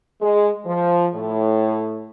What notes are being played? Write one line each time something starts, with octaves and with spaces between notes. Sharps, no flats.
G#3
F3
A2